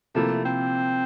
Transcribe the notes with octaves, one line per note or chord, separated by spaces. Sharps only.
C3 F3 A3 A#3 E4
C4